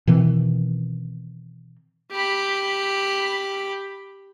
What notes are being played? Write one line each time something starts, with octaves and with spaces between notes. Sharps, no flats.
B2 D#3 E3 C4
G4 B5